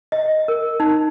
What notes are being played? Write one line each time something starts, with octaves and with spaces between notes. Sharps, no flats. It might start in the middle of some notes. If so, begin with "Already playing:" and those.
D#5
A#4
D#4